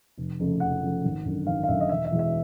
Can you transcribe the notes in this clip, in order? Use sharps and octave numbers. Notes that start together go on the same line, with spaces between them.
F1
F2 C#3 F3 A3
F1 F#5
F2 C#3 F3 A3
G#1
F#2 D3
G#1 F5
F5
F#2 D3 E5
D#5
E1 E5
E5
E2 B2 G#3
E5